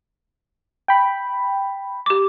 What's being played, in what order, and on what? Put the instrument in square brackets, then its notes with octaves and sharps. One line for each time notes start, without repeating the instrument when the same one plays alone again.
[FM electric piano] G5 B5
[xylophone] G4 D6